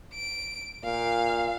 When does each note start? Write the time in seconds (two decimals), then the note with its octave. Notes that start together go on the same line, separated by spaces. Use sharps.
0.14 D7
0.84 A#2 F5